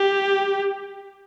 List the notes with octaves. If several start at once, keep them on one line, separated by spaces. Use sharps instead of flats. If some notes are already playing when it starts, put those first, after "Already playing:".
Already playing: G4